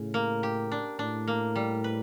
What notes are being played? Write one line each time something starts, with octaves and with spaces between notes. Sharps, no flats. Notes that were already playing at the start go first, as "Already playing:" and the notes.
Already playing: A2 C#3
A#3
G4
D4
A2 D4
A#3
G3
B4